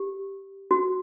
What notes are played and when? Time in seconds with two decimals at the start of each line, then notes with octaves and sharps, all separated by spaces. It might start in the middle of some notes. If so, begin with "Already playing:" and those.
Already playing: G4
0.71 F#4